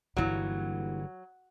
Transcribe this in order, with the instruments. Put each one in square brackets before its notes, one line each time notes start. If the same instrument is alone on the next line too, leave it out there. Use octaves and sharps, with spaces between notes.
[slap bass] G1 G2 E3 [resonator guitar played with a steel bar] F#3 [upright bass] A#3 E4